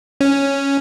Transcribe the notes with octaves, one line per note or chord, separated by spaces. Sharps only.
C#4